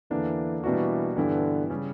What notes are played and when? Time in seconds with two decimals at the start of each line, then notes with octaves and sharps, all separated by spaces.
0.11 E2 D3 E3 A#3 D4
0.64 B2 E3 G3 A#3 D4 F#4
1.17 G2 D3 E3 B3 E4 G4
1.70 C#3 G3 C#4